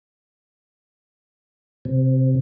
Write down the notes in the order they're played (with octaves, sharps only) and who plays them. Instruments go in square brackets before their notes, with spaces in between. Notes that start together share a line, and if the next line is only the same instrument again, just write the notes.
[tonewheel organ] C3